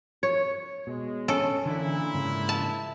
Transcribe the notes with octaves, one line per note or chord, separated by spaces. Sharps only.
C#5
B2 G#3
C#4 A4
A#2 D3 E3 E4
G#2 C#3
A5